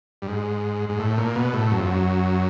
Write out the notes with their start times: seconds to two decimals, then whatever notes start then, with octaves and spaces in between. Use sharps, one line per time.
0.22 G2
0.27 G#2
0.89 G#2
0.99 A2
1.18 A#2
1.35 B2
1.53 A2
1.72 F#2
1.80 F2
1.87 F#2